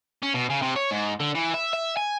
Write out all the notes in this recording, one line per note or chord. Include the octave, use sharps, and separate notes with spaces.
C#4
B2
C#3
C3
C#5
G#2
D3
E3
E5
E5
G#5